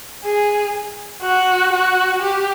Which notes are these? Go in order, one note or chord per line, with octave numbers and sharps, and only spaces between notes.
G#4
F#4
F#4
G4